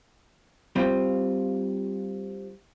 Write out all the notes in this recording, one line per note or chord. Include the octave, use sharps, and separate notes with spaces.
G3 C4 F4